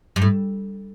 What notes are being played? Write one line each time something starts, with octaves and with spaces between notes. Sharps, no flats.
G2
A2